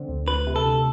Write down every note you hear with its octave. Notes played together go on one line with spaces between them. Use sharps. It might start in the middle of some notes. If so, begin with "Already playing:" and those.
Already playing: D3 C4
D2
D2 B4
C3
A4
D2